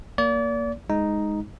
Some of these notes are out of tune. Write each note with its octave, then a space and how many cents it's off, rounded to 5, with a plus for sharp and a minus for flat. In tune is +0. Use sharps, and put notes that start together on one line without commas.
A#3 +0 D5 -35
G#3 +0 D#4 +0